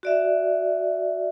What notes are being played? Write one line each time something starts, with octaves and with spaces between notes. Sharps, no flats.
F#4 D5 E5